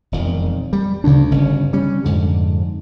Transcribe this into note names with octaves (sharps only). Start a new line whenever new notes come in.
E1 F2 D#3
G3
D2 C#3 D4
G1 C#4
G3 C#4
F2 G#2 D3